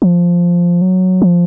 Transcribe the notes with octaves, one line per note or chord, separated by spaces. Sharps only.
F3
F#3
F3